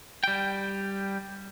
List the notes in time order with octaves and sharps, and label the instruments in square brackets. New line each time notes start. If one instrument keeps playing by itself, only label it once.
[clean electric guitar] G3 G5